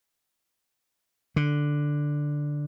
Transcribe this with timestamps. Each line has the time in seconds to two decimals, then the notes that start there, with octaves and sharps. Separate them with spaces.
1.36 D3